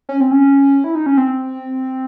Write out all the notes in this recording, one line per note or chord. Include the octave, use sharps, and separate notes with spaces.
C#4
C4
C#4
E4
D#4
C#4
C4